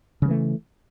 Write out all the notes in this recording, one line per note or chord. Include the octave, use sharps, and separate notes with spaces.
C#3 E3 G3 A3